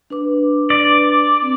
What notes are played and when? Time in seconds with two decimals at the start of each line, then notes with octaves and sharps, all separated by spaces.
0.10 D4 B4 D6
0.70 D5
1.42 C4